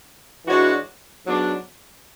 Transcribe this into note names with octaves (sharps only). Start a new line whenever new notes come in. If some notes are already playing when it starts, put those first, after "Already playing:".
E3 G#3 D4 F#4 C#5
G#2 F#3 B3 D4